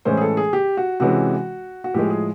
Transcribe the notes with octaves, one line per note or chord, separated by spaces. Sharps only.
A2 E3 G#3 C#4 C5
G#4
A4
G#4
G4
F#4
C3 E3 G#3 C#4 F#4
F#4
A2 F3 G#3 G4
G#4